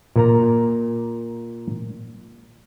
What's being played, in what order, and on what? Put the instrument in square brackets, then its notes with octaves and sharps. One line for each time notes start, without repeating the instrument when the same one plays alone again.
[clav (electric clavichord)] A#2 A#4 A#5